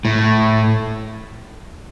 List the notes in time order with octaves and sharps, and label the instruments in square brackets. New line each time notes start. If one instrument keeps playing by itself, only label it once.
[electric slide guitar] A2